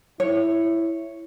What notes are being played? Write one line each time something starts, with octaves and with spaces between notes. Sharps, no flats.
E4 C#5